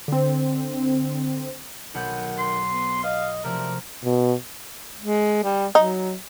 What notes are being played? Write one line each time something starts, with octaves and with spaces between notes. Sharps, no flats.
D3 C4
B1 D#3 F#5 G6
C6
B3
D#5 F5
C3 F3 A3 G4 A#4 D5 E5
B2
G#3
G3
F#3 D#4